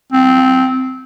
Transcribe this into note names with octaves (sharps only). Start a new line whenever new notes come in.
C4